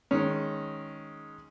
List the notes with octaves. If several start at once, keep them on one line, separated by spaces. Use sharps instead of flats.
D#3 G#3 C#4